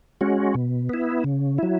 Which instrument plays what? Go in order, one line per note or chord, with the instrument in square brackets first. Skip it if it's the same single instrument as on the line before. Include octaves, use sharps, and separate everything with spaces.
[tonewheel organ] G#3 C#4 F#4
B2
B3 E4
C#3
F#3 E4